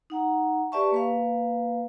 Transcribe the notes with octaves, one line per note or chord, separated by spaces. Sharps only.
D#4 F#5 A#5
G4 B4 D5 E5 A5 C#6
A#3 B4 F5